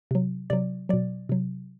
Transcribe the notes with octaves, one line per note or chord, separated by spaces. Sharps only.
C3 F#3
C3 F#3 D5
B2 F#3 D5
C3 F#3